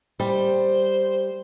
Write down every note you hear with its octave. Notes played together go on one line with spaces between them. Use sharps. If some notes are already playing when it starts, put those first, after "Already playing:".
G3 C5